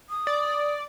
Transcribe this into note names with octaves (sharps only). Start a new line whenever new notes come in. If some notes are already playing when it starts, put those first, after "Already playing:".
D#6
D5